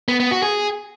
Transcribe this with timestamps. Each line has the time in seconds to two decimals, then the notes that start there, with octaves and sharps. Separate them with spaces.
0.08 B3
0.20 B3
0.31 F#4
0.43 G#4